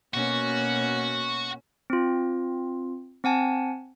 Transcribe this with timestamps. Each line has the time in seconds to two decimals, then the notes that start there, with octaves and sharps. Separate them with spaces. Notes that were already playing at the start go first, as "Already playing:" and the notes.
0.14 B2 A#3 C#4 F#4
1.90 C4 F4
3.24 C4 F#5 G#5 A5